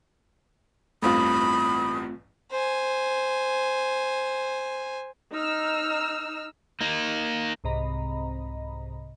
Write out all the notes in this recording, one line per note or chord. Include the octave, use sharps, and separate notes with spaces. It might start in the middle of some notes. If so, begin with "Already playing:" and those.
A1 E2 G2 A3 C4 F4 B5 D#6
C5 G#5
D#4 E6 F6
A#3 D#4
C2 G#2 C3 D#5 A#5 B5